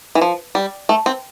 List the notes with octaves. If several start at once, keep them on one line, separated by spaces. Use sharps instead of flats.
E3
F3
G3
A3
C4